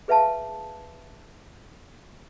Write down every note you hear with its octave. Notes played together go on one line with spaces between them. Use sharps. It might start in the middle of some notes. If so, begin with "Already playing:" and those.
G#4 B4 E5 F5 A5